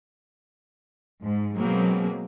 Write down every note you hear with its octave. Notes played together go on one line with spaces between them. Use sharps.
G#2
B2 F#3 G#3 A#3 C4